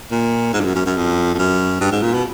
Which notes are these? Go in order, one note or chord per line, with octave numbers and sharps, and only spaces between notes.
A#2
G#2
G2
F#2
F#2
F#2
F2
F2
F#2
G2
G#2
A#2
B2